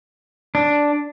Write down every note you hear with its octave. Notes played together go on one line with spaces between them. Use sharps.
D4